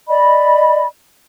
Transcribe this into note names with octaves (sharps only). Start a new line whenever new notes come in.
D5 D#5 B5